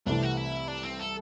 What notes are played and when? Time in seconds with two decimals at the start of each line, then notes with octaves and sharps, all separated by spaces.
0.06 C2 C3 E3 A3 D4
0.23 F#4
0.37 E4
0.68 D4
0.84 C4
0.99 A4